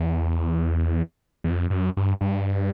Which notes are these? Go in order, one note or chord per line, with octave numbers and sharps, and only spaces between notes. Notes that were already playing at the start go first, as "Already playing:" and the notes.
Already playing: E2
E2
F2
G2
F#2
G2
G2